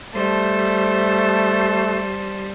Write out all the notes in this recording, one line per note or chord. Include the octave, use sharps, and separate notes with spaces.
G3 A3 C5 A5